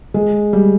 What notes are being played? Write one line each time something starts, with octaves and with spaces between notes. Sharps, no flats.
G#3
G3